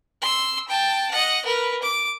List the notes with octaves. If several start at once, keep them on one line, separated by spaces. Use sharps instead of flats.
C6 E6
G5 A5
D#5 F#5
A#4 B4
D6